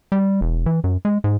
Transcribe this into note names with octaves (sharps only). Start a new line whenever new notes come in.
G3
E1
E3
F#2
G#3
G#2